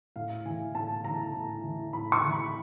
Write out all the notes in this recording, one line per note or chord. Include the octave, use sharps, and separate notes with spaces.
A2 F5
E3 G#5
A2 A5
E3 A#5
A2
E3
A2 B5
C#6
E3
B5